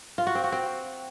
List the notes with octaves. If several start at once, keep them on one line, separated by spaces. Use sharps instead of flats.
F4
F#4
C4
F#4
C4